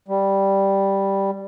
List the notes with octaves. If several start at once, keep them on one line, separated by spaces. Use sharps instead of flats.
G3